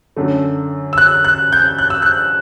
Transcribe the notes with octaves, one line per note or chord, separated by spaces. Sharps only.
F#2 D3 A3
E6
F#6
F#6
G6
F#6
E6
F#6